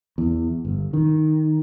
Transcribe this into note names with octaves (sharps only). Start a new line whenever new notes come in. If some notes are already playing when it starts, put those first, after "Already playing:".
E2
G1
D#3